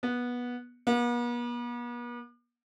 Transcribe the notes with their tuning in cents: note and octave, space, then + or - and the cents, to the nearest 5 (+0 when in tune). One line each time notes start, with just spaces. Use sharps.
B3 -15
B3 -45